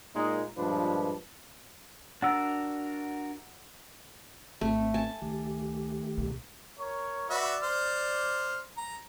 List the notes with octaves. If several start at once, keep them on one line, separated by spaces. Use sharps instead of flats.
A#2 G#3 A#3 D#4
G2 A#2 F3 G#3 D4 B4
D4 F#4 A#4 F#5 E6
G#1 A3 C4
G#5 A5
C#2 D#3 A3 G4
C2 B2
A#4 C#5
F#4 B4 D5 E5
C5 F6
A#5